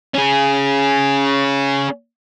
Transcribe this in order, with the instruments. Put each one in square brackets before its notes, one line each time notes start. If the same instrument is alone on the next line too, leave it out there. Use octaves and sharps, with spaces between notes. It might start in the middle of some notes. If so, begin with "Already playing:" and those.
[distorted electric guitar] C#4 G#4